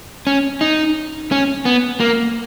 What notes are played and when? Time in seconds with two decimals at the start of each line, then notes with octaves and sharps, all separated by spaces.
0.27 C#4
0.61 D#4
1.32 C#4
1.65 B3
2.00 A#3